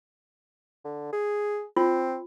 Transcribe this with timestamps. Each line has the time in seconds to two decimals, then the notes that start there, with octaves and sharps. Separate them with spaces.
0.85 D3
1.13 G#4
1.76 C4 F4